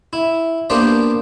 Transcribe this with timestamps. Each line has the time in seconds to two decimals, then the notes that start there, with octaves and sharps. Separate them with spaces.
0.13 E4
0.70 A#3 B3 D4 G4 C5 G5